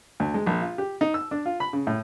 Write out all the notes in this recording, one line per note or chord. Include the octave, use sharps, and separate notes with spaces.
D2
G#3
A#1
F4
G4
D#4
E6
D4
F4
B5
C#3
A2